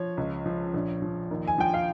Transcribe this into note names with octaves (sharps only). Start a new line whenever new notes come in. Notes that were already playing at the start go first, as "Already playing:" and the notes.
Already playing: F3 C#5
C#2
F3
A#1
F3
D#2
G#5
F3 G5
F5